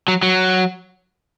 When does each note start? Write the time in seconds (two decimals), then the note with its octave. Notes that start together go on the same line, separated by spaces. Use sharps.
0.08 F#3
0.23 F#3